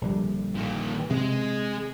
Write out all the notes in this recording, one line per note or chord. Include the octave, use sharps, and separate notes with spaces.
A#1 D3 G3
A#2 D#3
C3 G#3 G#4